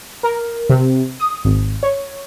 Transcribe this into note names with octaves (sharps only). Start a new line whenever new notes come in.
A#4
C3
D#6
G#1
C#5